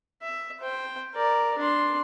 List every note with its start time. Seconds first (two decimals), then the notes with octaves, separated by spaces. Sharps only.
0.22 E5
0.60 C5 G5
1.15 A#4 D5
1.58 D4 C6